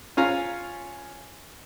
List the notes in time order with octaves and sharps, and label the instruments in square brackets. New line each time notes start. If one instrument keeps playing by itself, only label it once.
[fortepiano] C#4 F4 F5 G#5 A#5 F6